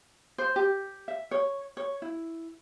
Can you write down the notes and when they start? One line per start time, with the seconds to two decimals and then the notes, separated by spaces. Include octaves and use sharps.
0.38 C5
0.56 G4
1.08 E5
1.31 C#5
1.77 C#5
2.02 E4